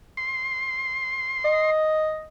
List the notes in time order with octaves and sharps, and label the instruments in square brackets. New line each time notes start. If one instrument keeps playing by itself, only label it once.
[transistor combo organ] C6
[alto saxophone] D#5